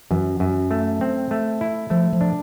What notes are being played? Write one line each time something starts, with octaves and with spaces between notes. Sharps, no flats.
F#2 E3
F#2
A3
C4
A3
E4
F3 A3
F3
D4